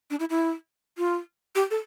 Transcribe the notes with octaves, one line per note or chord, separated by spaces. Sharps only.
D4
E4
E4
F4
G4
A4